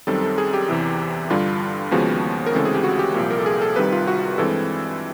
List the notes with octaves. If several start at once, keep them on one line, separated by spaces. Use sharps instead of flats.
F#2 D#3 G3 C4 A4
A4
G#4
G4
E2 C3 E3
G2 D3 G3 F4
D#2 C#3 F3 G#3 B3 F#4
A#4
D2 C#3 E3 G#3 C4 A4
G#4
G4
F#4
G4
C2 A#2 F3 A#3
A#4
A4
G#4
A4
C2 C3 D#3 G3 B4
F4
F#4
G2 E3 G#3 C4 A4